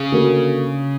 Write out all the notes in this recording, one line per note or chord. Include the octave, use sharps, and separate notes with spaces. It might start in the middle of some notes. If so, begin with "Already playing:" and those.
Already playing: C#3
D3 A#3 D4 F#4 A#4